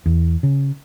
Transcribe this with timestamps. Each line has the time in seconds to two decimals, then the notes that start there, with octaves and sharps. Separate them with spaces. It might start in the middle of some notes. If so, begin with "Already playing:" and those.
0.06 E2
0.43 C#3